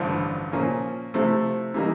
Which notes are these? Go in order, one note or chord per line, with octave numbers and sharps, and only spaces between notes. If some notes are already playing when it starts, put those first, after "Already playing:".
Already playing: A1 G2 D3 F3
A#2 F3 A#3 C#4
C3 F3 A3 C4 E4
C3 E3 G3 A#3 D#4